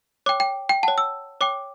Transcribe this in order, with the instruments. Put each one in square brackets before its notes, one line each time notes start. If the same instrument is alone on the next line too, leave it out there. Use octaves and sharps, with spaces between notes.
[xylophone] C#5 G5 D6
G5
G5
C#5 F#5 A5
E6
C#5 G5 D6